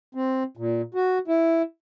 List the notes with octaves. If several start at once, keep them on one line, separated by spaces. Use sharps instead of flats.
C4
A#2
F#4
E4